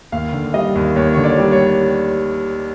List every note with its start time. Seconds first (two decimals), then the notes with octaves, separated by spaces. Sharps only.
0.12 D#2 F5
0.33 D3
0.54 G3 D#5
0.75 D#2
0.96 D#2 C#5
1.13 D3 C#5
1.24 D5
1.38 G3
1.52 C#5